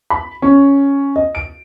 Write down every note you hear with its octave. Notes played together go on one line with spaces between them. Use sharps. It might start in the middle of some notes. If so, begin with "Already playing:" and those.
B5
C#4
D#5
D7